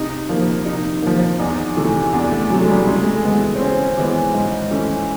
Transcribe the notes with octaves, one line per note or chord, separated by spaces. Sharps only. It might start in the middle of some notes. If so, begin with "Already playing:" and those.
Already playing: C3 D#4
F3 A#3
C3 D#4
F3 A#3
E2 D#4
C3 E3 A3
E2 D4
A3
C3 E3 F#3 A3
G#3
G3
C#3 G#3
A3
G#3
E3 G#3 B3
C4
C#3 C#4
E3 G#3 B3
G#2
E3 A3 C#4